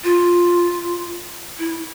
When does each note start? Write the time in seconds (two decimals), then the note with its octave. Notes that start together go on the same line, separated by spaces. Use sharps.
0.04 F4
1.59 E4